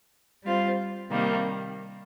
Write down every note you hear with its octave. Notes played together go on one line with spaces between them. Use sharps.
G3 C4 F4
C3 D#3 G3 A#3